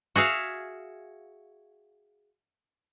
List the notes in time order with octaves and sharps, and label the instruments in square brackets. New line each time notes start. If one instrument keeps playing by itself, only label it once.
[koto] F#4 G#4 E5 F5